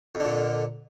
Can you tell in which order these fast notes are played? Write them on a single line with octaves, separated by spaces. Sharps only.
F2 D3 A#2